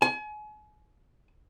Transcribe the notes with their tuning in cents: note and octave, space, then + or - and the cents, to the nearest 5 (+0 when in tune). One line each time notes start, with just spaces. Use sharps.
G#5 +35